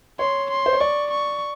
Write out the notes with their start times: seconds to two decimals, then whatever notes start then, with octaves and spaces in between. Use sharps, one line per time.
0.19 C#5 C6
0.51 C6
0.66 C5
0.73 C#5
0.80 D5 C#6
1.11 C#6